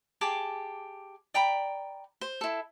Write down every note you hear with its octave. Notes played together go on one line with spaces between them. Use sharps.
G4 G#4 A5 D6
D5 G5 A#5 B5
C5
E4 A4